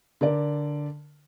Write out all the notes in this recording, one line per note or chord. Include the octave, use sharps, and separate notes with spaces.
D3 A#4 D5